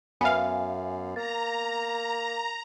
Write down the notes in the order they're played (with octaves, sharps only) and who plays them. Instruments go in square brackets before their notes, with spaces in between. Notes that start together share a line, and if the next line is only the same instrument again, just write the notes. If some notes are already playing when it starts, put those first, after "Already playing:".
[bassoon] F#2 [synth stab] B3 F5 [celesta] E5 G#5
[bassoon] A#3 [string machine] A#5 [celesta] A6